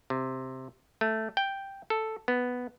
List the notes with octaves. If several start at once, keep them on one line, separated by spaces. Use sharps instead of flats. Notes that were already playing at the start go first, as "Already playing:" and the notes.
C3
A3
G5
A4
B3